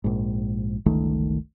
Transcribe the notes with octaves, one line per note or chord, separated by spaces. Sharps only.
A#1 G#2
G1 C#2 D#3 A3